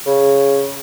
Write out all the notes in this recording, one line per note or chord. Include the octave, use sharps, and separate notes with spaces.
C#3